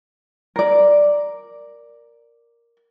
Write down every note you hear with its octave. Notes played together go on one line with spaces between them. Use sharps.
A#4 D5